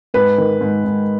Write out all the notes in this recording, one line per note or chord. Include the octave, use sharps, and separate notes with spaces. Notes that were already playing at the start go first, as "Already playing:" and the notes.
G#2 B4
D#3
G#2
G#2